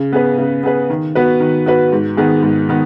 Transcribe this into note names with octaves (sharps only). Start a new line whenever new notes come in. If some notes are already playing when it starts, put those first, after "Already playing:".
Already playing: C#3
B3 G#4 B4
C#3
B3 G#4 B4
D#3
B3 F#4 B4
D#3
B3 F#4 B4
G#2
D#3 B3 G#4
G#2
D#3 B3